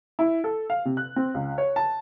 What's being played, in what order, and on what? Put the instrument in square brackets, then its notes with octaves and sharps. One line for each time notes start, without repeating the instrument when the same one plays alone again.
[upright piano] E4
A4
F5
C3
F#6
C4
C#2
C#5
A5